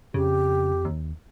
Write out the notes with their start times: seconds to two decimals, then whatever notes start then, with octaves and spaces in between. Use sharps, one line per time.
0.14 F2 C#3 G4
0.85 D#2